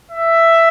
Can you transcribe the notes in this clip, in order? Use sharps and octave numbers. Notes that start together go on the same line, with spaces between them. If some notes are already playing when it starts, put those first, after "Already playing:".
E5